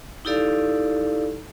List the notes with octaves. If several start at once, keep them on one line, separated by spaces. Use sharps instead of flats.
D#4 E4 G4 A4 D5 F5